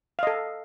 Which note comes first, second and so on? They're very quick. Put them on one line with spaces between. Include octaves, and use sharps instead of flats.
F5 D#5 A4